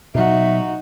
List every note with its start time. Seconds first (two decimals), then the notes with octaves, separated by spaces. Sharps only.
0.15 B2 F#3 D#4 F#4 E5